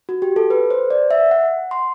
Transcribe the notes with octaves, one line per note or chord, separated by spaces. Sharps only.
F#4
G4
A4
B4
C5
D5
E5
F#5
C6